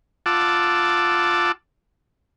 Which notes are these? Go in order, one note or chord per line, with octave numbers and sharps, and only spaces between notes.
F4 F#5 A5 D6 E6